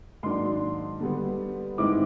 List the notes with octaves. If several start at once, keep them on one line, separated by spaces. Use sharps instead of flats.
G#2 D#3 F#3 A#3 D4 C6
D3 G3 B3
G#2 D#3 G#3 C4 E4 D6